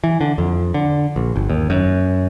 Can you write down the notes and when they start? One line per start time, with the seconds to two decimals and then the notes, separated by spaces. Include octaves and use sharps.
0.04 E3
0.21 D3
0.38 F2
0.74 D3
1.16 A#1
1.36 G1
1.49 D#2
1.70 F#2